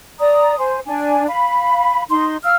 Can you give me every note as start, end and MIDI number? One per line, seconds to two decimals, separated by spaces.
0.19 0.57 74
0.19 0.57 82
0.19 0.57 87
0.58 0.79 72
0.58 0.79 80
0.85 1.26 62
0.85 1.26 80
1.27 2.03 77
1.27 2.03 83
2.10 2.36 63
2.10 2.36 84
2.44 2.56 77
2.44 2.56 88
2.44 2.56 89